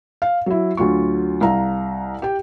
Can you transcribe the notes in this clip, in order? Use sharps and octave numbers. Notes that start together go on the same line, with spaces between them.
F5
F#3 E4
D2 F#3 F4 C#6
C2 F5 A#5
G4 G5